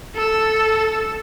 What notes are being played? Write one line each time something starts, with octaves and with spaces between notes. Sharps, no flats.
A4 E6